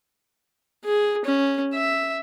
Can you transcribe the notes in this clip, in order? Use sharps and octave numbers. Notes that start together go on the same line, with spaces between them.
G#4
C#4
E5